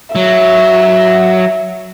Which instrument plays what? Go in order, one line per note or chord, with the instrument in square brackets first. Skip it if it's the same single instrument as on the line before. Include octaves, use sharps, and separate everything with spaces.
[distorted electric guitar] F#3 [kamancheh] E5